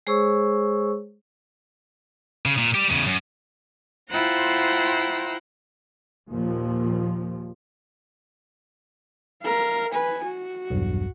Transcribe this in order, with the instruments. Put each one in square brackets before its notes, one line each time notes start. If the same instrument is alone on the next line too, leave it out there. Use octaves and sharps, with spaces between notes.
[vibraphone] G#3 G#4 C5 C#5 C#6 E6
[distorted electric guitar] C#3
A#2
G3 G4
E2 C#3
F#2
[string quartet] E4 F4 C5 F#5 G5 A#5
[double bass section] D#2 A#2 F3
[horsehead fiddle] A#4 F5
B4 G#5
F#4
[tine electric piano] B1 E2 G2